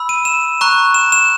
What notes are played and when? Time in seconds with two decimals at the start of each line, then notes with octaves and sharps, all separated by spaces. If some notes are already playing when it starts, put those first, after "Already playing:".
Already playing: B5 E6
0.09 D#7
0.25 E7
0.61 A#5 C#6 F#6
0.94 E7
1.12 E7